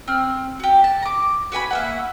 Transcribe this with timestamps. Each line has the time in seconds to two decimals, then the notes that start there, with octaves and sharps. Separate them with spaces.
0.08 C4 F6
0.60 F#4 G4
0.84 A5
1.02 A#5 D6
1.52 F#4 B4 G#5 B5
1.71 A#3 E5 F#5